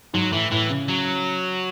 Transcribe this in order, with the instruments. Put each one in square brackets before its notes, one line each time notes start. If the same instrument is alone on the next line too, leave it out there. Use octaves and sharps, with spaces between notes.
[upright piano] G#2 [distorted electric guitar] F#3
[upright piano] A2 [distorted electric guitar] E3
[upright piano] A2 [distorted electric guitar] E3
[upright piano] C#3
[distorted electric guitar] F#3